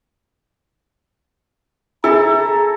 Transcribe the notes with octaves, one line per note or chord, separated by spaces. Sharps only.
E4 G#4 A4 A#5